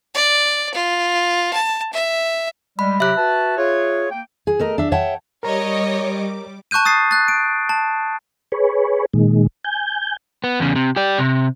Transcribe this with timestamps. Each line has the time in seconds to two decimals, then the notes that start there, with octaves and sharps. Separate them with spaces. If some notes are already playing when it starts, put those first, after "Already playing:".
0.14 D5
0.74 F4
1.53 A5
1.93 E5
2.79 G3 G#3 B5
3.00 C3 F#3 G4 E5 F#6
3.17 F#4 B4 A5
3.57 F4 G#4 C#5
4.10 A#3 G5
4.47 G#4
4.59 A3 A#4 D#5
4.78 D4 E5
4.92 C#5 E5 F#5 G5 A5
5.43 G3 A#4 C#5 D#5 A#5 D6
6.71 A5 C#6 F#6 G6 D#7
6.85 D#6 A6 C7
7.11 F#6 A6
7.28 D7
7.69 A5
8.52 G#4 B4 C#5
9.14 A#2 D#3 G#3
9.65 G#5 G6
10.44 B3
10.60 E2 C#3
10.76 C3
10.96 G4 D5
11.18 C3